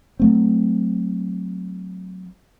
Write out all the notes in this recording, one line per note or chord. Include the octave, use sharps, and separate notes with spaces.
F#3 A3 C4